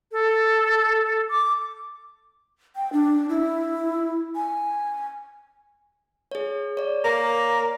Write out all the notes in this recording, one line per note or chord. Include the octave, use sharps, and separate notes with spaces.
A4
D6
G5
D4
E4
G#5
G#4 C#5
C#5 D5
A#3